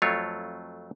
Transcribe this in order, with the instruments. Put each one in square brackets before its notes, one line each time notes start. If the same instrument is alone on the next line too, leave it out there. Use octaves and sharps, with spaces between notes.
[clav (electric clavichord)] F2 F#3 A3 F4 C#5